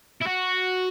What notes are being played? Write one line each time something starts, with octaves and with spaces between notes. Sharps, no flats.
E4
F#4